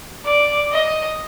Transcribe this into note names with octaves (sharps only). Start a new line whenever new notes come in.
D5
D#5